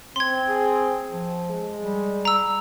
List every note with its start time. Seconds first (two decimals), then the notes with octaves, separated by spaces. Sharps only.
0.16 C4 C6 G#6
0.49 G#4
1.11 F3
1.49 G#3
1.80 G3
2.25 A#5 E6